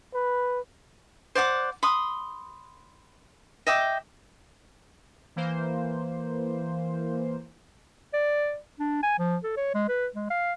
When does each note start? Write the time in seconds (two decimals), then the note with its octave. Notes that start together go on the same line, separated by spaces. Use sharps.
0.14 B4
1.35 C5 D5 F#5 D6
1.83 B5 C6 D#6
3.67 D#5 E5 G5 D6
5.36 E3 A#3 C5
8.13 D5
8.79 D4
9.03 G#5
9.19 F3
9.43 A4
9.57 C#5
9.74 G#3
9.89 B4
10.15 G#3
10.30 F5